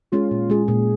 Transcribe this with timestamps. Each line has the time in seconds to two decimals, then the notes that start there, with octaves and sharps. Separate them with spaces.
0.12 G#3 C#4 F4 G#4
0.31 A#2
0.50 G#3 C#4 G#4
0.68 A#2 G#4